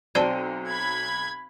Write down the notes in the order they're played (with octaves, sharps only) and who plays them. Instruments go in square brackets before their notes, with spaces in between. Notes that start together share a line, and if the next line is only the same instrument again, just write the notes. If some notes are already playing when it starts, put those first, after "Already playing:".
[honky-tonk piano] B1 F#3 D#7 [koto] C4 G5 [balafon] D5 A5
[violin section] B5 G#6